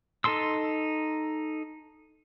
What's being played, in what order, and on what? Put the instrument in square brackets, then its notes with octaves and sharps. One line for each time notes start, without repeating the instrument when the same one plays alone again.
[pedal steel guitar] D#4 A4 A5 C6 E6